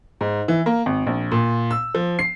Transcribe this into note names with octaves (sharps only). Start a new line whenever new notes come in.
G#2
E3
A#3
G#1
A#1
A#2
E6
F3
C7